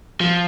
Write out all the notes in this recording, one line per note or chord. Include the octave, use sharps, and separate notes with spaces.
F3